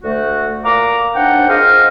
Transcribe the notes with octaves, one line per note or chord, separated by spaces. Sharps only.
D2 A3 F#4
A#2 F5 A#5 D6
D#2 C4 D4 F#5 G5
F4 G#4 C5 D#5 F6